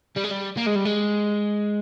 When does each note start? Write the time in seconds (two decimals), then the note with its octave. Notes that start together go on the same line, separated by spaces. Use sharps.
0.17 G3
0.24 G#3
0.31 G3
0.58 A#3
0.67 G#3
0.76 G3
0.85 G#3